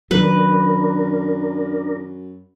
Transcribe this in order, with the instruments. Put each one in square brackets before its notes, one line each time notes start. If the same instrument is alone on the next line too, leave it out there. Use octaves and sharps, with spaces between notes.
[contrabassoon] F#2 [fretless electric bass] D#3 F#3 [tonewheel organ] D4 A#4 [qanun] B4